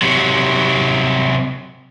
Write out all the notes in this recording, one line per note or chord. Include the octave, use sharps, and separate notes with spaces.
C3 F#3